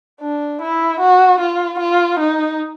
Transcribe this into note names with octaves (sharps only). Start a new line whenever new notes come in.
D4
E4
F#4
F4
F4
D#4